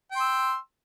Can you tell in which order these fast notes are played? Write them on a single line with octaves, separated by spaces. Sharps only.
G5 C6 E6